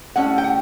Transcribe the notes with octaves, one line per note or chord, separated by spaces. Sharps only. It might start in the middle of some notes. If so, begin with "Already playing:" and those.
A2 G3 C#4 F#5
G5
F#5